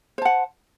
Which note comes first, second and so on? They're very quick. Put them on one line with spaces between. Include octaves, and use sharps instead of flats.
C5 A5 F#5